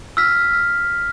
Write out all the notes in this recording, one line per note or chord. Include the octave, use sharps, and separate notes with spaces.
E6 F6 B6